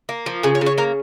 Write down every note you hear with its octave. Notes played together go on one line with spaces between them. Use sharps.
A#3
F3
C#3 G#4
C#5
C#3
C#5
A#3 A#4